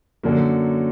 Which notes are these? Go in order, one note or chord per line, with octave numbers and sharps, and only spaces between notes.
F#2 D3 F#3 A#3